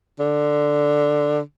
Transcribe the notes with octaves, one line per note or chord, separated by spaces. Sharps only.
D3